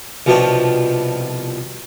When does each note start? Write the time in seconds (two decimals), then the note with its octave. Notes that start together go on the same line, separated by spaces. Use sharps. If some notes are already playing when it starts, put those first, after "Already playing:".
0.26 C2 B2 F3 D4 G4 C#6